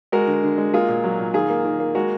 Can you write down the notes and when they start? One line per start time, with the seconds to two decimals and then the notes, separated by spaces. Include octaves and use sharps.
0.12 G#3 F#4 A#4
0.27 D3
0.43 D3
0.58 G#3
0.74 A#3 F4 G#4
0.88 A#2
1.04 F#3
1.19 A#2
1.34 D#3 F4 G#4
1.50 A#3
1.65 D#3
1.80 A#3
1.95 G#3 F#4 A#4